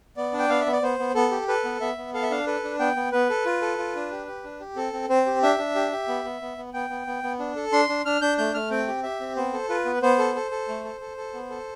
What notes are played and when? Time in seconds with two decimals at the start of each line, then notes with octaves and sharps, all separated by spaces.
0.17 B3 D5
0.33 D4
0.39 G5
0.49 B3 F5
0.61 E5
0.66 B3
0.72 D5
0.82 B3 C5
0.99 B3
1.15 B3 A4
1.31 G4
1.48 A4 B4
1.64 B3
1.80 B3 E5
1.97 B3
2.14 A4 F5
2.23 E5
2.31 D4 F5
2.47 A4 B4
2.64 D4
2.79 B3 G5
2.96 B3
3.12 B3 B4
3.29 A4
3.45 F4
3.62 A4
3.78 F4
3.95 D4
4.11 G4
4.27 G4
4.44 D4
4.60 G4
4.76 C4 A4
4.93 C4
5.09 C4 C5
5.26 G4
5.43 D4 E5
5.58 D4
5.75 G4
5.92 G4
6.08 B3
6.24 B3
6.41 B3
6.58 B3
6.74 B3 G5
6.90 B3
7.07 B3
7.23 B3
7.39 D4
7.56 A4
7.72 D4 C6
7.89 D4
8.05 D4 F6
8.21 D4 G6
8.38 A3 G6
8.54 A3 F6
8.70 C4 G5
8.88 G4
9.03 G4 E5
9.20 C4
9.36 B3 C5
9.53 A4
9.69 F4 B4
9.85 B3
10.02 B3 C5
10.19 A4
10.35 A4
10.51 A4
10.68 A3
10.84 A4
11.01 A4
11.17 A4
11.34 B3
11.50 A4